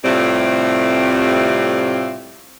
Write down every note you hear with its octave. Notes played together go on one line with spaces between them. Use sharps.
A2 C3 G3 A3 C4 F4